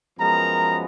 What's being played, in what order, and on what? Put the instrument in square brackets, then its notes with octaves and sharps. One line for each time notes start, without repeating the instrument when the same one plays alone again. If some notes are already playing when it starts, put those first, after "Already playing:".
[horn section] F#2 F3 G#3 B3 A#4 A#5